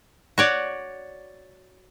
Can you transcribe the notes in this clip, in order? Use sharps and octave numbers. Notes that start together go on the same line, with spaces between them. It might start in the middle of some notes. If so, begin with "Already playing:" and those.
F#4 C#5 D5